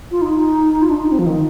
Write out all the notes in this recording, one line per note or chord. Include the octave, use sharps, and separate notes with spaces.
F4
D#4
F4
D4
D#4
C4
F3
D#3